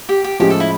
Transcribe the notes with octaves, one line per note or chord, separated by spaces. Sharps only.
G4
G4
A2 F3 G#3 C#4 G4
A4
E4